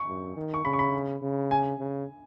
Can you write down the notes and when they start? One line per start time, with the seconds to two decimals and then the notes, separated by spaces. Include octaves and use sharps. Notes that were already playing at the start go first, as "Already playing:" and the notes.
Already playing: C#6
0.08 F#2
0.37 D#3
0.54 C#6
0.65 C#3 B5
0.73 C#6
0.79 B5
1.23 C#3
1.51 G#5
1.80 C#3